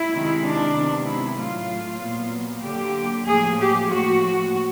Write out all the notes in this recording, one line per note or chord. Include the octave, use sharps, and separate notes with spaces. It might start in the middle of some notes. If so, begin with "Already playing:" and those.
Already playing: E4
C3 D#3 G#3
D4
C3 D#3 G#3 B3
E4
A2 F#3 A3 F4
A#2 F#3 B3
D3 F#3 A#3 G4
A2 F3 A#3 G#4
G4
A2 F3 A#3 F#4